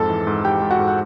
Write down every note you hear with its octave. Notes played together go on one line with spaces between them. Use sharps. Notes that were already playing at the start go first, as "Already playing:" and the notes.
Already playing: F2 G#2 A4 A5
E3
G#2
G#2 G4 G5
G#2
F#4 F#5
G#2
F#5